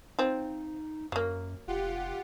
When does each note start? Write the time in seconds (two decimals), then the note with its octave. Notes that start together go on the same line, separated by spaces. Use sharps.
0.19 C4 D#4 F4
1.12 F#2 F#3 A#3
1.68 F1 F4 G4 F#5